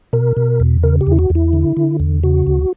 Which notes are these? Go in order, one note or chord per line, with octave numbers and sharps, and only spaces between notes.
B2 A#4
B2
E2
C#3 A#4
G4
E2 E4
F#4
E2
E4
D3
D3
E2
C#3 F#4
D2